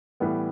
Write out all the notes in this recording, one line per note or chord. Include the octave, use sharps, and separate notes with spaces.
A2 E3 G3 B3